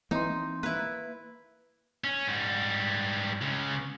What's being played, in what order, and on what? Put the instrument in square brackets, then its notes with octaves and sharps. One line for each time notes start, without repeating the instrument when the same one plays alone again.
[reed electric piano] E3 C6 [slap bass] A#3 C4 [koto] D#4
[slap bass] A#3 [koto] E4 B4
[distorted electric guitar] C#4
G#2 G3
C#2 C#3